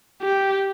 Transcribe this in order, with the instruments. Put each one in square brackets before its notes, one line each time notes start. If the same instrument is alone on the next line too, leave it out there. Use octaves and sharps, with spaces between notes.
[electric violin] G4